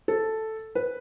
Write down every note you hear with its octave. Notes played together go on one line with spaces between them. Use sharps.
A4
B4